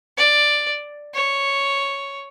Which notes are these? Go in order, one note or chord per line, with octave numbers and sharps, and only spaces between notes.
D5
C#5